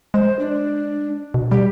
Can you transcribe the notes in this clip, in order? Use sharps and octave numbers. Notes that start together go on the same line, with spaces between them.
G#3 C5
D4
B2
G3 G4